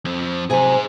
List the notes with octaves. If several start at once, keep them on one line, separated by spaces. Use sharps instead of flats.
F2 C4
C3 F#3 G#4 C5 G#5